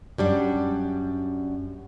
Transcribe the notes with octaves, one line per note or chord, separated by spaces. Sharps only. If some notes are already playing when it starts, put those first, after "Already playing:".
F#2 G3 D4